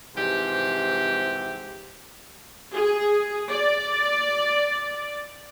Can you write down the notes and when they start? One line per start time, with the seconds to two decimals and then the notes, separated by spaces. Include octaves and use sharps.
0.15 G#2 C3 E3 F3 G4
2.73 G#4
3.50 D5